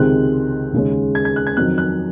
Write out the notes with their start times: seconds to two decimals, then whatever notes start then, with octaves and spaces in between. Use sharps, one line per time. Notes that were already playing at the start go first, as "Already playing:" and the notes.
Already playing: C#2 C3 D#3 G#3 C4 F#6
0.73 D#2 C#3 G#3 C#4
1.15 G#6
1.25 G#6
1.36 F#6
1.47 G#6
1.57 F2 D#3 F#3 C4 F#6
1.78 F#6